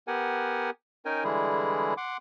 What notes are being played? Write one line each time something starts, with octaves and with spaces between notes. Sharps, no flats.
B3 G4 A#4 F#5 G#5
C#4 D#4 A#4 G5 G#5
D3 E3 G3 G#3 E4 G#4
F#5 C6 D6